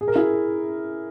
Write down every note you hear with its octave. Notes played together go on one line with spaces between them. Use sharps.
G#4
A#4
E4 G#4